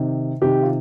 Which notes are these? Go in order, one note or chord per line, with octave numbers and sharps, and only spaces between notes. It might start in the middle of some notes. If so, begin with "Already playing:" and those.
Already playing: C3 D#3
C3 D#3 G4
F4